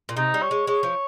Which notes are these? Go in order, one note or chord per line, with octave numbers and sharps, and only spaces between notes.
A#2
C3 D#4
G3
C#5
G#3
G#3 C#5
F3